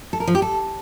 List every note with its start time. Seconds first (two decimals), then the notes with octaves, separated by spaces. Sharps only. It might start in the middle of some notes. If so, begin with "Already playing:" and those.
0.13 A4
0.20 A#4
0.27 F3
0.35 G4
0.42 A4